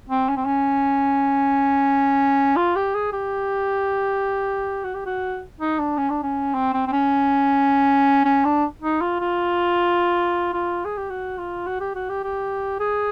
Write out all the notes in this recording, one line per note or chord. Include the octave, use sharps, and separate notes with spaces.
C4
C#4
C4
C#4
F4
G4
G#4
G4
F#4
G4
F#4
D#4
D4
C#4
D4
C#4
C4
C4
C4
C#4
C#4
D4
D#4
F4
F4
F4
G#4
G4
F#4
F4
F#4
G4
F#4
G4
G4
G#4